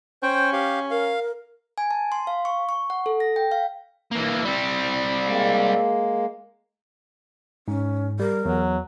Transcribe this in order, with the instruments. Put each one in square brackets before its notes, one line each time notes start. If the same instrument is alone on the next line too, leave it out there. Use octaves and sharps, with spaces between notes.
[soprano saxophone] C#4 [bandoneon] C5 G5
[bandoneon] G4 F5
[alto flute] A#4 [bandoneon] F5
[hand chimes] G#5
A5
C6
F5
C#6
C#6
F#5
A4
A#6
G5
F5
[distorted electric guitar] E3 A#3
G3 C4
[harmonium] G#3 A#3
[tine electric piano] G#2 [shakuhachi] C#4
[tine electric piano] G3 [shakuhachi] A#4
[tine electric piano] E2 [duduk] F#3